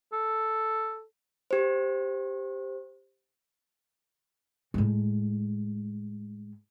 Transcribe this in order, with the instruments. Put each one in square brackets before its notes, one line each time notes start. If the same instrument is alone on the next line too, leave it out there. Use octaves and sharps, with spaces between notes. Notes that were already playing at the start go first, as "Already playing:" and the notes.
[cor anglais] A4
[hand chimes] G4 C5
[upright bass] A2 G#3